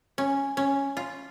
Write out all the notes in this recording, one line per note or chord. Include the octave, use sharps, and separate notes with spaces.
C#4
C#4
F4